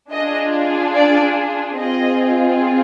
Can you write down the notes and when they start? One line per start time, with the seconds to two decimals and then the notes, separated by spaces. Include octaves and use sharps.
0.12 D4 F4 G#4 D#5
0.96 D5
1.78 C4 F4 G#4 D#5